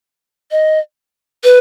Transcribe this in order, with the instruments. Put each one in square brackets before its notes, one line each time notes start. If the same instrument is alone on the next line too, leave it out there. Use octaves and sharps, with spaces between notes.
[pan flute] D#5
B4